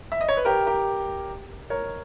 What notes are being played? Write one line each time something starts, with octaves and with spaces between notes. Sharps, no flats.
E5
D#5
C#5
B4
G4 A#4
G4 A#4
A#4 C#5